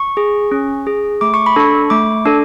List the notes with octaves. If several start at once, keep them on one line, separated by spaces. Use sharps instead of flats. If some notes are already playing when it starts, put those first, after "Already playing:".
Already playing: C#6
G#4
C#4
G#4
A3 D6
C#6
B5
D4 A4 C#6
A3 D6
D4 A4